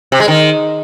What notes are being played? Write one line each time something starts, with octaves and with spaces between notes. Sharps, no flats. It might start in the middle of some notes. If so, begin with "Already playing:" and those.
C3
G#3
D#3